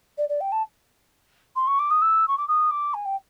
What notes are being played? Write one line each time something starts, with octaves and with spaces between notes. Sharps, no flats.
D5
D5
G5
A5
C6
C#6
D6
D#6
E6
C#6
D6
D#6
D6
G#5
G5